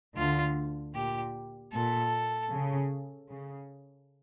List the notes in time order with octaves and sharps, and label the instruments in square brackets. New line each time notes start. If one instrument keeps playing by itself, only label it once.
[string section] D2 D3 [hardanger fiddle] F4
[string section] A#2 [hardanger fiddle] G4
[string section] A#2 [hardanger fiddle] A4
[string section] C#3
C#3